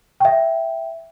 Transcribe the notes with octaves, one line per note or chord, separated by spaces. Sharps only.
E5 G5